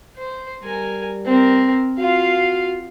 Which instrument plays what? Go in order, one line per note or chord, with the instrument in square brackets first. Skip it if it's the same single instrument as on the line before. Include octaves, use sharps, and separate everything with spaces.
[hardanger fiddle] C5
[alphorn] G3 [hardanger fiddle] A#4 G#5
[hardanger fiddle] C4 A#4
[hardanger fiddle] F4 F5 [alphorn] F#4